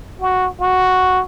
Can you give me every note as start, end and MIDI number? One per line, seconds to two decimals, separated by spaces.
0.21 0.48 66
0.60 1.23 66